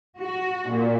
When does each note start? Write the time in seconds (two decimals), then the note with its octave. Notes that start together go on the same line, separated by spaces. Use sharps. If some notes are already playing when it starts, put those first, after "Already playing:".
0.18 F#4
0.68 A#2